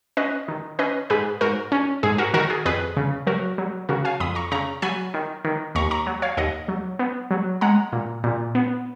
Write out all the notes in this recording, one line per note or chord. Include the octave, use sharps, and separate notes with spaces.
C#4 B4 D#5
D#3
C#4 B4 D#5
G#2 G#4 B4
G#2 F#4 A#4
C#4
G#2 G#4
F#4 A#4
D#3 F#4 A#4
G#4
F2 G#4 B4
C#3
F#3 F#4 A#4
F#3
C#3 F#4 A#4
F5 G#5
F2 B5 D#6
A#5 C#6
C#3 A#5 C#6
F#3 G#5 B5
D#3
D#3
D#2 A#5 C#6
A#5 C#6
F#3
C#5 F5
D#2 D#5 F#5
F#3
B3
F#3
G#3 F#5 A#5
A#2
A#2
B3